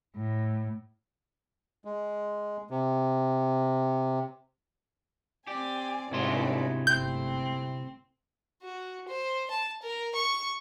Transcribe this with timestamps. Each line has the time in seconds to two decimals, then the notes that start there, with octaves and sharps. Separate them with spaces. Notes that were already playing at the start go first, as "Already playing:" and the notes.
0.16 A2
1.85 G#3
2.71 C3
5.47 C4 G4 D5 G#5
6.11 G1 G#2 C3 E4 F#4 C6
6.87 G1 A3 C4 G6
8.63 F#4
9.08 C5
9.50 A5
9.83 A#4
10.15 C#6